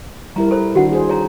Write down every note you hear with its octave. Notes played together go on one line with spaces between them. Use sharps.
G3 E4 A#4 A#5
A4 C5
D#3 D4 F#4 F#5
G#4 C5
C#5 A#5